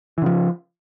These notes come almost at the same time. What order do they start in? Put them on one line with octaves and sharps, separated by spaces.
E3 C#3 F3